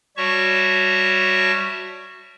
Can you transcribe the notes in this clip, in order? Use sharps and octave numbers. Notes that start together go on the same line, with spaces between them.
G3 F#4 C#5 E5 A5 C#6